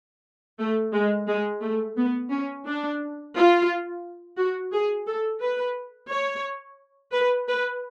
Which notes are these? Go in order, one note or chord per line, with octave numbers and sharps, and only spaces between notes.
A3
G#3
G#3
A3
B3
C#4
D4
F4
F#4
G#4
A4
B4
C#5
B4
B4